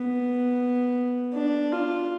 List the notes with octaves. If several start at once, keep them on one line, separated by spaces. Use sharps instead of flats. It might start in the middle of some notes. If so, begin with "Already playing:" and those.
Already playing: B3
D4
F4